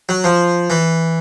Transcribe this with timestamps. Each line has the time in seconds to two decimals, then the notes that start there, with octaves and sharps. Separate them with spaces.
0.09 F#3
0.24 F3
0.70 E3